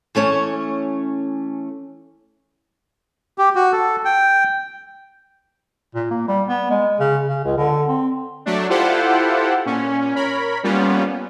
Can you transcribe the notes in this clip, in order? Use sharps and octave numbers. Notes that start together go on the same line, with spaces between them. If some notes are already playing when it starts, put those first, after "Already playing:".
E3 A3 C#4 C#5
G4
F#4
A4
G5
A#2
A#3
G3
B3
G#3
C#3
C#3
C#2
D3
C4
F#3 A3 D4
E4 F4 G4 A4 C5 F#5
A#2 C#4
A#4 C#5 B5
G3 A#3 B3 C#4 F4